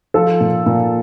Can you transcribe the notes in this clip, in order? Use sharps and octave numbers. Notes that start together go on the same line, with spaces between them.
F3 F4 A4
A#2
A#2